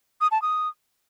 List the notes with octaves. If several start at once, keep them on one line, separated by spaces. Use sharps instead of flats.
D#6
A5
D#6